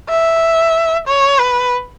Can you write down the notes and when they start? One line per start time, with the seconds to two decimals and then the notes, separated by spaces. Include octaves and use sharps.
0.09 E5
1.08 C#5
1.40 B4